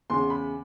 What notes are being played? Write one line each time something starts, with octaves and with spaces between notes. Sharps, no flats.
E2 C#3 C6
B5